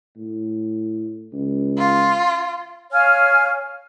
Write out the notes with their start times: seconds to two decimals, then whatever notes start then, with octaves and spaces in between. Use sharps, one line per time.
0.17 A2
1.33 C#2
1.78 F4
2.92 C#5 F5 G#5 F6